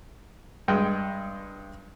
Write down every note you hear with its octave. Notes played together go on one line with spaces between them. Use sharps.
G2 G#3 G5